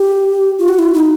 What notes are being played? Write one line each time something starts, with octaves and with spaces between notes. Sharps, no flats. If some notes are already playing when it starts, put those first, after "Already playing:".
Already playing: G4
F4
F#4
E4
D#4